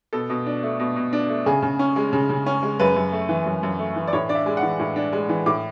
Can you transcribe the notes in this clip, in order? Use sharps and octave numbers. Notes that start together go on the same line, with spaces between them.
B2 A4
B2
D4
A3
B2
B2
D4
A3
C#3 G#4
C#3
C#4
G#3
C#3
C#3
C#4
G#3
F#2 B4
F#2
A3
E3
F#2
F#2
A3
E3
D5
A2 C#5
D4 D5
E5
G#3
F#5
E3
A2
D4
G#3
E3
A2 D6